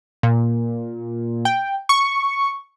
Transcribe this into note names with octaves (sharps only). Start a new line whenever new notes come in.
A#2
G5
C#6